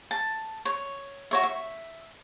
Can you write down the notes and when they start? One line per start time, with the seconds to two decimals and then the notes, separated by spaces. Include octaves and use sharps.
0.11 A5
0.65 C#5
1.31 F#4 C#5 E5
1.43 E5